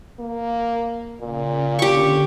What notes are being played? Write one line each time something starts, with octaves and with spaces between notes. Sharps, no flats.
A#3
A#2 C#3
D3 C#4 G4 C#6